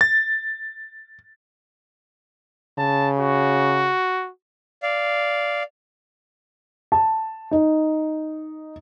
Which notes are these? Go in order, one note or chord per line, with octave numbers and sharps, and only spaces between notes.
A6
C#3 A5
F#4
D5 F5
A5
D#4